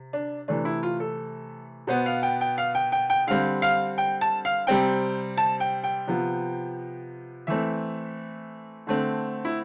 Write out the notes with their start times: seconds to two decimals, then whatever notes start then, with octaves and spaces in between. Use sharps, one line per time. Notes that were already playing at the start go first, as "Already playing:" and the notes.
Already playing: C3
0.13 D4
0.48 C3 E3 A3 D4
0.65 E4
0.83 F4
1.00 A4
1.87 B2 B3 C5
2.06 F5
2.23 G5
2.41 G5
2.58 F5
2.75 G5
2.92 G5
3.10 G5
3.27 D3 G3 C4 F5
3.62 F5
3.98 G5
4.21 A5
4.45 F5
4.67 C3 G3 C4 G5
5.37 A5
5.60 G5
5.84 G5
6.07 C3 F3 B3
7.47 E3 A3 C4 E5
8.87 D3 A3 C4
9.45 E4